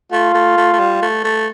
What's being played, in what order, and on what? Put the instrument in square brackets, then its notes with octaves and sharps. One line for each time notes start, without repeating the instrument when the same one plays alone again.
[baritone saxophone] A3 [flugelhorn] F4
[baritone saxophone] A3
A3
A3
G3
A3
A3